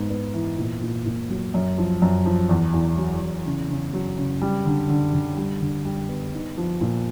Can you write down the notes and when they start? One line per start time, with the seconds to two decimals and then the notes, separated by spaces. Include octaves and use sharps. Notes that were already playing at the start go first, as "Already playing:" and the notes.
Already playing: G#2 B3
0.10 B3
0.34 E3
0.58 A#2
0.82 A#2
1.06 A#2
1.30 F#3
1.54 F#2
1.78 F3
2.02 F#2
2.26 F3
2.49 E2
2.74 E2
2.97 F#3
3.22 E2
3.46 C#3
3.70 C#3
3.93 F#3
4.17 C#3
4.42 G3
4.66 D3
4.89 D3
5.14 D3
5.37 G3
5.61 D3
5.85 G3
6.09 B3
6.33 D#4
6.58 F3
6.81 A#2